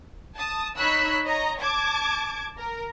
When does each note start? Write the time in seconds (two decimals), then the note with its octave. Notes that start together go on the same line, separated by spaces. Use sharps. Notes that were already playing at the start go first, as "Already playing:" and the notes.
0.35 A5 D#6
0.76 D#4 C#5 B5 E6 F#6
1.24 C#5 D#5 A#5
1.61 A5 D6 G#6
2.58 A#4